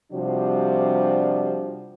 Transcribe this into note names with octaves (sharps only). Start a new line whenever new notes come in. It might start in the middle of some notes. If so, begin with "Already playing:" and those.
C3 F3 G3 D4 F#4 C5